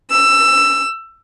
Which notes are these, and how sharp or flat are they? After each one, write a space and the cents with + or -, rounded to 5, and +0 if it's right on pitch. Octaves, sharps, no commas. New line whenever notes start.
E6 +15